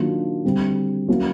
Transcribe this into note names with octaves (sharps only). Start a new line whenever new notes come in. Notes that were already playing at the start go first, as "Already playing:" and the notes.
Already playing: D#3 F#3 A#3 D4 F4
D3 G3 C4
F#3 A#3 C#4 E4